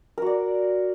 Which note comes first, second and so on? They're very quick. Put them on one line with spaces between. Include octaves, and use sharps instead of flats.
A#4 F#4 D5